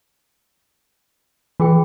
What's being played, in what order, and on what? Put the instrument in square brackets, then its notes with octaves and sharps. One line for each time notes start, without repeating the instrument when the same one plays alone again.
[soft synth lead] E3 [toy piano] F4 G#4 G5